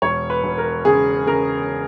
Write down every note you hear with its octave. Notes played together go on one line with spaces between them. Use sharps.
E1 C#5
B4
E1
A#4
C#3 G#4
C#3 A#4